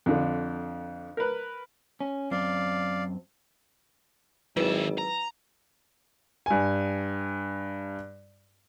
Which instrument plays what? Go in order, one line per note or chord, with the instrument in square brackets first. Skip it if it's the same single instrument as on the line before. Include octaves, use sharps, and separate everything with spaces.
[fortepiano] F2 D3
A#4 B4
[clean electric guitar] C#4
[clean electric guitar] F#2 C4 [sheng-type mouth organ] D5 F5
[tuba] G#1 [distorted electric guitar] D#3 E5 [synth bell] F#3 E4 B4
[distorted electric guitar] A#5
[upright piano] G2 G#5